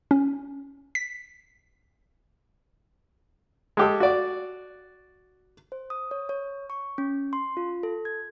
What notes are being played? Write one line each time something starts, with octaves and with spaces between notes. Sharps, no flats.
C#4
B6
G#3 G4 A4
F#4 D5
C5
D#6
C#5
C#5
C#6
C#4
C6
F4
A4
G#6